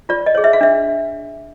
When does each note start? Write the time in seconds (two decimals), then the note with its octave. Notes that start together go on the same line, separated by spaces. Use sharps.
0.09 F4 D5
0.26 D#5
0.35 G#4 C#5
0.44 E5
0.53 F5
0.61 D4 E5